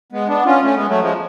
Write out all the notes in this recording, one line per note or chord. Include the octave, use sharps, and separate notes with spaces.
G#3 B3
B3 D4
C#4 F4
A3 C#4
G#3 B3
F#3 A3
F3 G#3